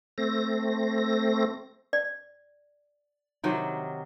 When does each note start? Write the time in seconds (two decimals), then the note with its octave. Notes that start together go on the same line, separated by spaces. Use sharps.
0.18 A3 C4 A#6
1.93 D5
3.44 C3 D#3 F#3